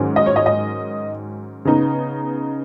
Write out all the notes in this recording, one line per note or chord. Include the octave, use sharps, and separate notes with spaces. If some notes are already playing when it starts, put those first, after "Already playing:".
Already playing: G#2 D#3 F#3 C#4
D#5
C#5
D#5
D#5
C#3 B3 D#4